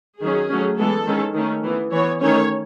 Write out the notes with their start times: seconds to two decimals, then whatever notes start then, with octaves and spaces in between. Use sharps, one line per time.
0.21 D#3 F#3 C#4 G#4
0.50 F#3 A3 C#4
0.78 E3 G#3 B3 A4
1.07 D#3 G#3 C#4
1.35 D#3 A3 C#4
1.64 E3 B3
1.92 E3 B3 C#5
2.21 D#3 A3 C#4 C#5